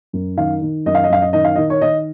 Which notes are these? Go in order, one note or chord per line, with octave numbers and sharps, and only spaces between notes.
F#2
D#3 F5
D#3
F#2 D#5
F5
D#5
F#2 F5
D#5
D#3 D#5
F5
D#3 D#5
C#5
D#3 D#5